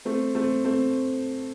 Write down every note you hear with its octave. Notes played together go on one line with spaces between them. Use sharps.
A3 C4
A3 C4
A3 C4